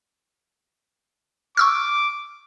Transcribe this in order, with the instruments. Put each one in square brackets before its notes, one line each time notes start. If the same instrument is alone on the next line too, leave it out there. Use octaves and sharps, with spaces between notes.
[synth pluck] C#6 E6 F6 [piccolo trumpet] D6